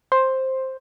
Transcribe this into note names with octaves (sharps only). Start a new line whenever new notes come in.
C5